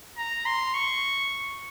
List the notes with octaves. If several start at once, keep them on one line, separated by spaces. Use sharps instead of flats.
A#5
C6
C#6